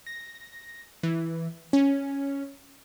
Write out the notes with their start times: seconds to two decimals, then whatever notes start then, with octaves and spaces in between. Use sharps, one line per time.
0.07 A#6
1.03 E3
1.73 C#4